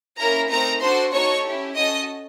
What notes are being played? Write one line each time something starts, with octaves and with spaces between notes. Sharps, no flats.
A#3 C#4 E4 A#4 A#5
A3 C4 D#4 A#4 A#5
D4 F#4 A4 C5 C6
B3 D#4 F#4 A4 C#5 C#6
C#4 E4 G4
C#4 F#4 A4 D#5 D#6